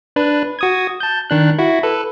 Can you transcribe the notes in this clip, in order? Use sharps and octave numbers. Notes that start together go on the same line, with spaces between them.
D4 B4
F#4 D#6 G#6
A5 G6
D#3 D4 F#6
E4 F#4
A4 B4